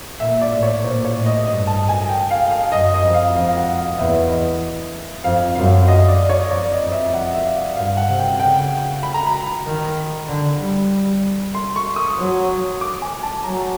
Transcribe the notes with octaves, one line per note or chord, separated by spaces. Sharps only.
A#2 E5
D5
A2
C#5
A#2 C5
C#5
A2
D#5
G2 D#5
A5
G#5
G5
F5
F5
F#2 D#5
D#5
F2
F5
F2 F5
F5
F#5
F5
E2 E5
D#5
F2 F5
F#2 F5
D#5
D5
C#5
F2 D5
D#5
F2
E5
F#5
E5
F5
G2 F5
F#5
C3
G5
C#3 G5
B5
A#5
B5
D#3
D3
G3
C6
C#6
D#6
F#3
D6
G#5
A5
F#3 A#5